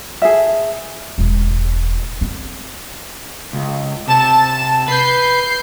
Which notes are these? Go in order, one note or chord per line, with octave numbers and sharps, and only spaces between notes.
G#4 A4 E5
E1 A1
C4
C#2
C3 A5 E7
B4 G6 C7